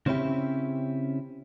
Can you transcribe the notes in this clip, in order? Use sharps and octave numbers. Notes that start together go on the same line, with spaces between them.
C#3 C4 C#4 E4 G4